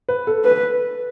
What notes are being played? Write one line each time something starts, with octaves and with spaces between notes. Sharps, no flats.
B4
A4
B4